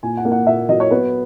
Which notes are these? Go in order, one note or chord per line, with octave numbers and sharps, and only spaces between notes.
A#2 G#5
F#5
A#3
F#5
A#2 E5
F#3 D#5
C#5
B3 B4